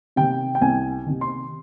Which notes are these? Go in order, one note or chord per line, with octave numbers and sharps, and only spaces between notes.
C3 D#3 G5
G5
C2 G#5
C3 D#3
C6